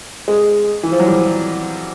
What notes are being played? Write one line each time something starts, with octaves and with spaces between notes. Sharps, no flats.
G#3
E3
F3
F#3
G3